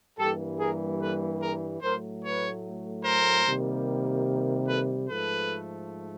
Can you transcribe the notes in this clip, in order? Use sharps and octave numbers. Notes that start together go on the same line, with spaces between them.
G2 E3 G3 A#3 G4 A4
G#4 A#4
A4 B4
G#4 A#4
A2 F#3 A3 A#4 C5
B4 C#5
A#4 C5
C3 D#3 G3 A#3
A4 B4
G#2 F3 A3 A4 B4